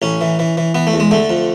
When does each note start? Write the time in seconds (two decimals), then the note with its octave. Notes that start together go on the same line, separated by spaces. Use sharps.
0.02 A1 C#4
0.21 E3
0.39 E3
0.57 E3
0.75 E3 B3
0.87 A3
0.93 E2
1.00 G#3
1.11 D3 A3
1.30 F2